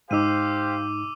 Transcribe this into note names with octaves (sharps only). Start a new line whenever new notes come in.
G#2 D#4 G4 C5 F5 D6 E6 D#7